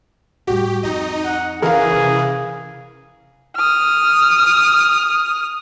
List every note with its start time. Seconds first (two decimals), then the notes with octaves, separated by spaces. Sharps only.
0.47 A2 G3 F#4 G4
0.83 F2 D#4 D#5
1.25 F#5
1.62 C#3 E3 G#4 A#4 F5
1.93 C3
3.57 D#6 F6